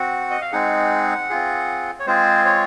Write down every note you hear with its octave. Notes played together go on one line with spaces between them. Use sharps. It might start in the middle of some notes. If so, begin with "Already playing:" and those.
Already playing: C4 F#4 F#5
D#5
F5
G#3 C4 D#4 G#4 F#5
C4 F4 G#4
C#5
G#3 C4 F4 G#4 C5
C#5